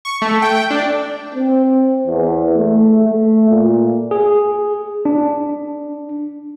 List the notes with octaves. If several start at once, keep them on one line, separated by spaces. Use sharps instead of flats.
C#6
A3
G5
D4
C4
E2
A3
A3
A#2
G#4
D4